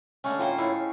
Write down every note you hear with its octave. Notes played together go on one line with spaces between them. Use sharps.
D3 G#3 A3 C#4
A2 A#3 F4 C5 C#5 G5
G#3 A3 E4
C#5